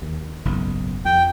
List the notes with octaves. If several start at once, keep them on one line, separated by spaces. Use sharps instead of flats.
D#2
F#1 B1 G#2
F2 G5